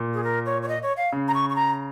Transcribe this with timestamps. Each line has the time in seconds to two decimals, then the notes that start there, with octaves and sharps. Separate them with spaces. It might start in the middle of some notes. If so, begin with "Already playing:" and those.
Already playing: A#2
0.14 G#4
0.24 A#4
0.46 C#5
0.62 C#5
0.68 D#5
0.83 C#5
0.97 F5
1.12 C#3
1.28 A#5
1.34 C#6
1.50 C#6
1.56 A#5